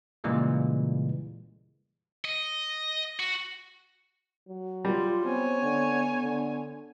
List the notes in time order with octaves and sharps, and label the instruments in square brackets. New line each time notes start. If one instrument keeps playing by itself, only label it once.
[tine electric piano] A#2 C#3 E3 G3 G#3 A#3
[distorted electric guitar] D#5
F#4
[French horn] F#3
[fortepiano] G3 [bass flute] F4
[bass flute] B3 [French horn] C4 [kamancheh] C#5 G#5
[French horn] D3
D3